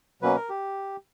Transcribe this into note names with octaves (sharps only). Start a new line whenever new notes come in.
B2 F#3 A#3 C#4 B4
A#4
G4